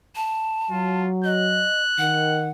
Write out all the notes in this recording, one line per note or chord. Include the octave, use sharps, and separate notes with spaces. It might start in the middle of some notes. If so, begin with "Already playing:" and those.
A5
F#3 F4
D#5 F#6
D#3 F#5